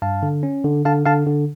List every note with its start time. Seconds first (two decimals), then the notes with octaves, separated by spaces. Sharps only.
0.02 G2 F5 A5
0.23 D3
0.43 C#4
0.64 D3
0.85 D3 F5 A5
1.05 D3 F5 A5
1.27 D3